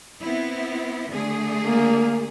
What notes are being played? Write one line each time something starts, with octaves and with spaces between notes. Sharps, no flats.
B3 C4 E4
D3 A3 G#4
A#3